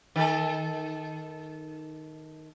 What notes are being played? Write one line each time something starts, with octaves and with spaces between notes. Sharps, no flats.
D#3 A4